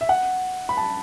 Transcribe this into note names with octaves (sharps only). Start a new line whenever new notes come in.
E5
F#5
B5
A5